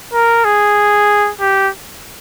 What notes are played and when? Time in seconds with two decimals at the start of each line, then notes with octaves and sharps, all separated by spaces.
0.13 A#4
0.45 G#4
1.41 G4